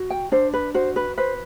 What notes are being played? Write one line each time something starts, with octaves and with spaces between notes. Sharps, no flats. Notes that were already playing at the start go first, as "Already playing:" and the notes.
Already playing: F#4
G5
D4 C5
B4
F#4 C5
B4
B4 C5